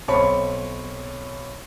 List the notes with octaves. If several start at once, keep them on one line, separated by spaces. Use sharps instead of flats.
B1 C4 C#5 B5 C#7